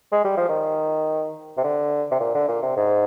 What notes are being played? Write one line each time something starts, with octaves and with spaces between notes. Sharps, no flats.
G#3
G3
F3
D#3
C3
D3
C3
A#2
D3
A#2
C3
G#2